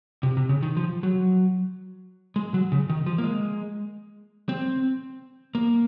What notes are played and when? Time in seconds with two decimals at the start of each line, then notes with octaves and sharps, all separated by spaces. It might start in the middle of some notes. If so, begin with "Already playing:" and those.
0.23 C3
0.37 C3
0.49 C#3
0.63 D#3
0.77 F3
1.03 F#3
2.36 G#3
2.54 F#3
2.72 C#3
2.90 D#3
3.06 F3
3.18 A#3
3.24 G#3
4.49 C4
5.55 A#3